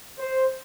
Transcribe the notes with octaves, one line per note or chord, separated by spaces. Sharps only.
C5